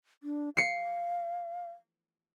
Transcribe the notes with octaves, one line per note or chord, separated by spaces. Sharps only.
D4
F5 C7 C#7